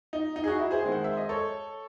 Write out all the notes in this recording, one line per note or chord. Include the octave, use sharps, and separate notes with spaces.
D#4
D#4
G#4
D#4 F#4
E4
G#4 C5
D#3 G#3 C4
F#5
E5
D#5
A4 C#5